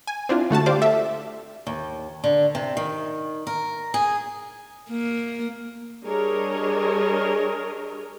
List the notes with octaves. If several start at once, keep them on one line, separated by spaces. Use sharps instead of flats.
G#5
C4 D4 E4 F4
D3 A3 F#4 A5
G4 C5 D5 F5 D6
A4 E5
D#2
D3
C3
D#3
A#4
G#4
A#3
G3 D4 G#4 A#4 C#5 D#5